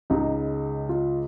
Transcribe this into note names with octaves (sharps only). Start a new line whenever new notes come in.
C#2 C#3 G#3 D#4
F4